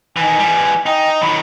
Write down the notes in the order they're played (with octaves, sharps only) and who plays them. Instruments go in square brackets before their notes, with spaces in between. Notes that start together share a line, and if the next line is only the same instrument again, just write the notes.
[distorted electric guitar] D#3 E3 [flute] G#5
[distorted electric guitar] E3 G3
[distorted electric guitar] D#4 [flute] G5
[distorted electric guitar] D#3 F#3 [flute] B5